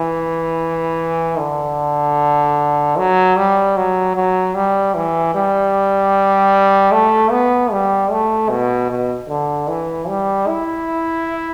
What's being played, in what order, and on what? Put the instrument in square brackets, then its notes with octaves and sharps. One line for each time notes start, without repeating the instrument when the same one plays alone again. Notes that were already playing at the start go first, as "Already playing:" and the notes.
Already playing: [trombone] E3
D3
F#3
G3
F#3
F#3
G3
E3
G3
A3
B3
G3
A3
B2
B2
D3
E3
G3
E4